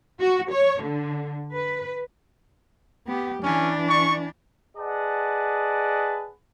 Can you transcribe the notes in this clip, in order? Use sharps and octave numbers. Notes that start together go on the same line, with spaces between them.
F#4
C#5
D3
B4
B3 G4
E3 C#4 D4
C#6
G#4 B4 D5 D#5 F#5 A5